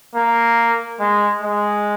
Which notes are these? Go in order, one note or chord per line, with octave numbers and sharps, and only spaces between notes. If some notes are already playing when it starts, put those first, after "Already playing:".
A#3
G#3
G#3